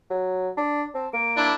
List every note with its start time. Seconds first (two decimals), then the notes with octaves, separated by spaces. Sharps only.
0.10 F#3
0.57 D4
0.94 C4 A5
1.13 A#3 D7
1.37 D4 E4